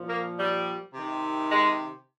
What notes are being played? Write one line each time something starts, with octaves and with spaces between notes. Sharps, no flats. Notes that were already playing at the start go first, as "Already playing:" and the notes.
Already playing: A#2 F3
A#3
G3
C3 D#3
G#3